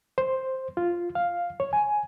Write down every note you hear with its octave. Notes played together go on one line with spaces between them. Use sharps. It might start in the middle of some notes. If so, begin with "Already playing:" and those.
C5
F4
F5
C#5
G#5